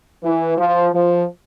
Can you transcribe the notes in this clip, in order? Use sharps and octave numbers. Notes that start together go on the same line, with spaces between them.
E3
F3
F3